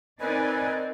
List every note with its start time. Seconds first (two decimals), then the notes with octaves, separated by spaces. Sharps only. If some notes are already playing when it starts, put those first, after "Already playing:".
0.20 C4 D#4 A#4 B4 D5 D#5 G#5